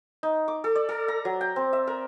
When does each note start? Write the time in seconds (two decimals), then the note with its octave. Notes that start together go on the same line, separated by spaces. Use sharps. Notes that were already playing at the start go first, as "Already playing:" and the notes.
0.23 D#4
0.48 D6
0.64 A4
0.75 D5
0.89 A4
1.08 A#5
1.25 F#3
1.41 G5
1.56 C4
1.73 E5
1.87 A#4